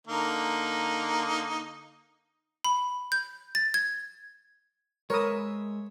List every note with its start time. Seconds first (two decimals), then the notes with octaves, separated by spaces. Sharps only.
0.07 D3 A#3 D#4
2.65 B5
3.12 G6
3.55 A6
3.74 G#6
5.10 G#3 A#4 B4 C#5 E5 D#6